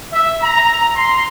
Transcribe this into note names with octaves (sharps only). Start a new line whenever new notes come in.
E5
A#5
C6